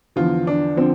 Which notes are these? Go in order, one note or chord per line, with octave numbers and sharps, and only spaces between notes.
E2 D3 F3 F4
D4
D3 F3 C4